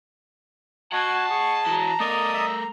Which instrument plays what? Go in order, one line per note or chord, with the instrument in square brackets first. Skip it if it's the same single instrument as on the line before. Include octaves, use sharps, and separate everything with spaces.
[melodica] F#4 [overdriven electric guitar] D#5 F#5 [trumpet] A5 [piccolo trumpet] G#6
[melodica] G#4 [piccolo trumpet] C#6
[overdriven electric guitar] E3 F#4 [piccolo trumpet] A#5
[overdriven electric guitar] A3 A#4 [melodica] D5 D#5 D#6
[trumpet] E5 [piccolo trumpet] A#5